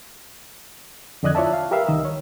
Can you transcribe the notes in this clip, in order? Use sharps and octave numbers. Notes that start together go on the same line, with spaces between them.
F2 D3 D5 D#5 F#6 G#6
E4 F4 C#5 D5 E5 A5
F5
G4 A#4 B4 E5 F5
C2 D#3 D#5 E6
C#5